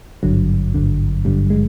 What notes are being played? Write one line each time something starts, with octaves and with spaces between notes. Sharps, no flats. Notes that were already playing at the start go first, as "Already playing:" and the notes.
G#1 G2 D3 F#3
G#1 G2 D3
G#1 G2 D3 G3
G#3